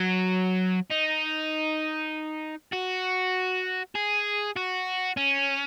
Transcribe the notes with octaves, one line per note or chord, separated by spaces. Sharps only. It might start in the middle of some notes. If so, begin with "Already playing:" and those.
Already playing: F#3
D#4
F#4
G#4
F#4
C#4